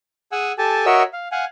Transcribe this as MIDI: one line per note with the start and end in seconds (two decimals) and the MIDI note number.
0.32 0.52 68
0.32 0.52 78
0.32 0.52 80
0.32 0.52 88
0.58 0.86 67
0.58 0.86 69
0.58 0.86 80
0.58 0.86 81
0.86 1.03 66
0.86 1.03 70
0.86 1.03 73
0.86 1.03 75
0.86 1.03 76
0.86 1.03 88
1.13 1.28 77
1.32 1.45 77
1.32 1.45 78
1.32 1.45 80